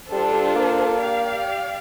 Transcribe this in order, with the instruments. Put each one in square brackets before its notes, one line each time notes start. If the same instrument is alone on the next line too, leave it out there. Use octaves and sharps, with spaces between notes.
[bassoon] G3 [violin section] D4 F4 A4 C5
[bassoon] G3
A#3
[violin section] G4 D5 F5